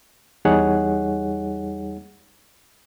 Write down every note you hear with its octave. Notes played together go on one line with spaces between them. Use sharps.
E2 G3 D#4 G#4 C#5 F#5